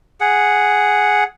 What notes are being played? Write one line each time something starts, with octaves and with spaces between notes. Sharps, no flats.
G#4 F#5